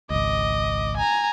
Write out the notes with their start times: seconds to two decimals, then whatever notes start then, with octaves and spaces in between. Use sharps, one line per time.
0.10 G#1 C#2 D#5 D6
0.97 G#5 A#5